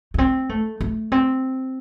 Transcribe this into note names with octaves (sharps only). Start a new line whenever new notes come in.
A3
C4
A3
A3
C4